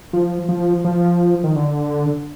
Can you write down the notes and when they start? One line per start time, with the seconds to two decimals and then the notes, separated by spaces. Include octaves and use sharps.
0.13 F3
0.49 F3
0.85 F3
1.44 D#3
1.56 D3